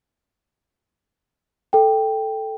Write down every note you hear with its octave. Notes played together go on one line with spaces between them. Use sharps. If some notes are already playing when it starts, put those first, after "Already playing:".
A4 G5